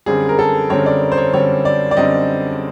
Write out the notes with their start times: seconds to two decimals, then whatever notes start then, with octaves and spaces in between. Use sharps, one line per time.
0.06 F#2 D3 G3 C4 G#4
0.29 A#4
0.39 A4
0.70 F#2 D3 G3 C4 C#5
0.86 D5
1.12 C5
1.18 C#5
1.33 F#2 D3 G3 C4 C#5
1.65 D5
1.91 D5
1.97 F#2 D3 G3 C4 D#5